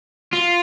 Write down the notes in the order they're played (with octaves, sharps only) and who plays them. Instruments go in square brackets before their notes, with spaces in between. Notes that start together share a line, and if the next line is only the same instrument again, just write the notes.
[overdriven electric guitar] F4